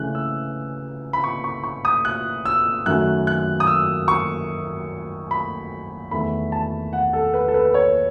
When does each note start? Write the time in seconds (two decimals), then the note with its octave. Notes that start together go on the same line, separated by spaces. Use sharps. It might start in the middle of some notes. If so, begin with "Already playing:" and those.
Already playing: C#3 E3 A3 F#6
0.15 E6
1.13 B5
1.24 C#6
1.44 C#6
1.64 C#6
1.85 D#6
2.05 F#6
2.45 E6
2.86 F#2 D#3 F#3 A3 F#6
3.27 F#6
3.60 D#6
3.67 E6
4.08 C#6
5.31 B5
6.11 E2 D#3 A3 B5
6.52 A5
6.93 F#5
7.13 A4
7.34 B4
7.48 A4
7.54 B4
7.65 B4
7.74 C#5